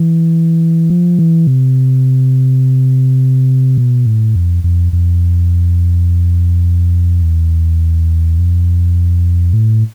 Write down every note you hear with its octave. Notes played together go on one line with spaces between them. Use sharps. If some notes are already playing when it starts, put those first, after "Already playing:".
Already playing: E3
F3
E3
C3
B2
A2
F2
F2
F2
E2
F2
A2